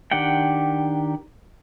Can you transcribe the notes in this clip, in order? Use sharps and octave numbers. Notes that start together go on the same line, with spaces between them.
D#3 D4 G4 F#5 G5